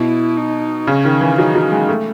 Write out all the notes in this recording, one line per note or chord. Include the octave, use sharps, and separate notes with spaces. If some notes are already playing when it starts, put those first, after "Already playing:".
Already playing: B2 E4
D#4
C#3 C#4
D#3
E3
F#3 D#4
F#3
G#3
A3